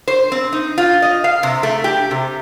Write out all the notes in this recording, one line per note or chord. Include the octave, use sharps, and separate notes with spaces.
C5
C4
D#4
F4
D#5
F5
C3
A3
G4
C3